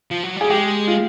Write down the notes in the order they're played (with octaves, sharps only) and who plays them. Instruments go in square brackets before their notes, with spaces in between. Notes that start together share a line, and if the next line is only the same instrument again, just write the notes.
[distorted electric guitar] F3
F#3
[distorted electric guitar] G3 [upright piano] G#4
[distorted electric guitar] G#3 [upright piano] G4
[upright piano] F4